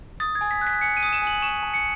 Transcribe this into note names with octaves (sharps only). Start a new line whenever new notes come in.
D#6 A6
G#6
G#5
B6
F#6
B6
G#5 C#7
D#7
D#6
E7
G#5 F#7
C#6 E7
A5
C#7